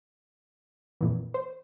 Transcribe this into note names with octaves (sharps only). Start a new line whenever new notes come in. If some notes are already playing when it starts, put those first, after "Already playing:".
F2 A#2 E3
C5